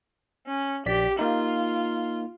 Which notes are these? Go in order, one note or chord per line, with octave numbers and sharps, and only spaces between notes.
C#4
A#1 G4 D5 B6
A#3 D#4 F4